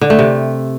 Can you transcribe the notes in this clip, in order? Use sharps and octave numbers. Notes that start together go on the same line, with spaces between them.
D3
A3
C3